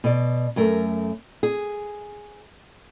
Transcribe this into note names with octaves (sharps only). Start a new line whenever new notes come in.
B2 D5
F#2 A3 A#4
G#4